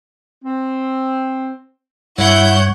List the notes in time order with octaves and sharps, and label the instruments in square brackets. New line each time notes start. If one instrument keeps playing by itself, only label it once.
[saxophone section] C4
[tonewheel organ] G2 C#5 [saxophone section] E4 [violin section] F#5 G6